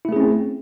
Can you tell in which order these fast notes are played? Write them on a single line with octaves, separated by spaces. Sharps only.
E4 A3 G#4 C#4 C4